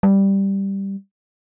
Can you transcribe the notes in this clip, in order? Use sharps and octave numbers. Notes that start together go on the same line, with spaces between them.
G3